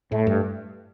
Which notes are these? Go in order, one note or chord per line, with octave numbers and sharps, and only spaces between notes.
A2 A3
G2